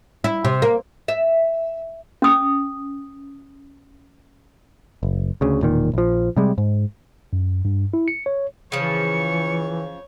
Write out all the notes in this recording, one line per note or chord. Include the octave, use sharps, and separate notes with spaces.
E4
C3
A#3
E5
C#4 D#6
F#1
D2 C#3
E1 A#2 D#3
A#1 F3
C3 G3 G#3
G#2
F#2
G2
E4
C#7
C#5
C#3 E3 F3 C#5 C#7